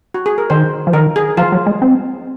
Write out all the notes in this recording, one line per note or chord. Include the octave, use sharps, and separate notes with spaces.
F#4
G#4
A#4
D#3 C5
F3
D#3 A#4
G#4
F3 F4
F#3
G#3
C4